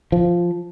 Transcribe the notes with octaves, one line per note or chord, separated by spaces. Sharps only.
F3